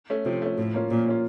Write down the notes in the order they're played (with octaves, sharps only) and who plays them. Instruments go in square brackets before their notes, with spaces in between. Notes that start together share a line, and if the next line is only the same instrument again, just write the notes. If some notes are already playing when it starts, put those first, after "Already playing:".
[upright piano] A3 C#4
[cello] C3 [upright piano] F3
[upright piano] A3 C#4
[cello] A2 [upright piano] F3
[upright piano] A#3 C#4 F4
[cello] A#2 [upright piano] F3
[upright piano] A#3 C#4 F4